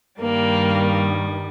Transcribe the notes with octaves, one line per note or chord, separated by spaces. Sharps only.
G2 D#3 G3 A#3